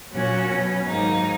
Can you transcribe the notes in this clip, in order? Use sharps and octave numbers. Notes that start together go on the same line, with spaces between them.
A#2 F#3 C#4 F#4
B2 F#3 C#4
G#2 D#3 F#3 A#3 D#4